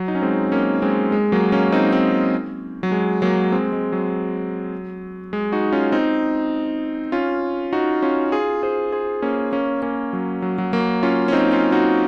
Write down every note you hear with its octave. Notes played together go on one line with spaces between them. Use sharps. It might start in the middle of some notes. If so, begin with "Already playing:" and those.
Already playing: F#3
D#4
C#4
G#3 C4
A#3 C#4
G#3 C4
G#3
F#3 A#3
A#3 C#4
C4 D#4
C4 D#4
F#3
G#3
F#3 A#3
G#3 C4
G#3
F#3
G#3
D#4 F#4
C#4 F4
C4 D#4
C#4 F4
D#4 F#4
C#4 F4
F4 G#4
G#4 C5
G#4 C5
A#3 C#4
A#3 C#4
A#3 C#4
F#3
F#3
F#3
F#3 A#3
C#4 F4
C#4
C4 D#4
C#4 F4
D#4 F#4